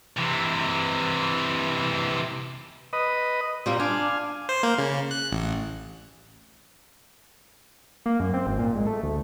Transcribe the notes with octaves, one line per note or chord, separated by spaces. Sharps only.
C3 E3
B4 D#5
A#2 G3 A#3 C4
D4 F5 G#5
C5
A#3
C#3
F#6
A1
A#3
F#2
C4
G#1
A#2
G#2
A3
D2